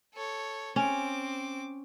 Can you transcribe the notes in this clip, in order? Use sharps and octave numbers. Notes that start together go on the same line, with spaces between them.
A4 C#5
C4 C#4 D6